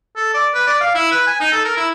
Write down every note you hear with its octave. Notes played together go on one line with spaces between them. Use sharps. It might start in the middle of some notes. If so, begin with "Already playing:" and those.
A4
D5
B4
D5
F5
E4
B4
G#5
D#4
A4
A#4
E4